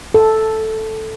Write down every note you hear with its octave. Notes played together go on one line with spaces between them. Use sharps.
A4